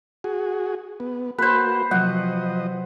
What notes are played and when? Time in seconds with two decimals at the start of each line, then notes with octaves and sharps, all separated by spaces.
0.24 F#4 G#4
1.00 B3
1.39 A#3 F#4 B4 C5
1.91 C3 F3 F#3 D#5 F#5